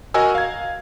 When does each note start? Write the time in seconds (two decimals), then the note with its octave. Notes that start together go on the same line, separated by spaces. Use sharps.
0.14 F#4 A#4 D#5 F#5 G#5 E6
0.35 F5 G#6